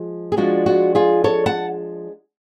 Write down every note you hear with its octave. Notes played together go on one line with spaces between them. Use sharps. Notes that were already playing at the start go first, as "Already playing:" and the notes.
Already playing: F3 G#3
G#4
F3 G#3 D4 F4 F#4
F#4
F4 G#4
A4 C#5
F#5 A5